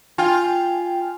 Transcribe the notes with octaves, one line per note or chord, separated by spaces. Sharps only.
F4 G5 G#5